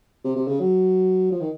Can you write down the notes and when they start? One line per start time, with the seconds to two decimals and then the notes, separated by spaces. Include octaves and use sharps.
0.25 C3
0.36 C3
0.48 C#3
0.60 F#3
1.31 F3
1.41 D#3